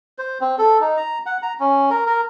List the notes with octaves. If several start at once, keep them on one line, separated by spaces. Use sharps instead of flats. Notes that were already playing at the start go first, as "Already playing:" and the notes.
C5
C4
A4
D#4
A#5
F#5
A#5
C#4
A#4
A#4